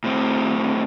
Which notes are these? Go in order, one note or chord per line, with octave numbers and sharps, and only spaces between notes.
A2 C4